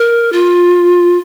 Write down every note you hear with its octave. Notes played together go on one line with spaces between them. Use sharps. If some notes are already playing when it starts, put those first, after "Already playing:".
Already playing: A#4
F4